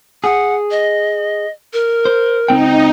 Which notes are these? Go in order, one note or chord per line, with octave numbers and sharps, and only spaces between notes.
G#4 F#5
D#5
A#4
C5
C#2 C4 D#4 G5